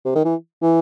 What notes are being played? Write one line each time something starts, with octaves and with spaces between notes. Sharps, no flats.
C3
D#3
E3
E3